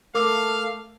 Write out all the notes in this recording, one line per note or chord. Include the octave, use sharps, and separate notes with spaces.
A3 A#4 F5 D6 E6